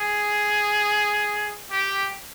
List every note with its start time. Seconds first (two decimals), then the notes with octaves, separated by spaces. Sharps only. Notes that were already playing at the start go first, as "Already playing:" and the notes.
Already playing: G#4
1.71 G4